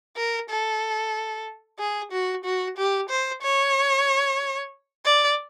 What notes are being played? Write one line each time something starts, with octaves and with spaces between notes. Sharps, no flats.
A#4
A4
G#4
F#4
F#4
G4
C5
C#5
D5